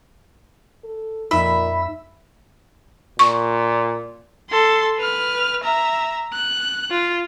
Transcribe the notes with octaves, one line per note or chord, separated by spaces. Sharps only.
A4
F2 A#2 D#4 E5 B5
A#2 C#6
A4 C6
B4 F6
E5 A#5
F#6
F4